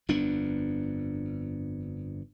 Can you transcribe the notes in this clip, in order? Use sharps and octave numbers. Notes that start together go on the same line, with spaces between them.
G1 F2 B3 D4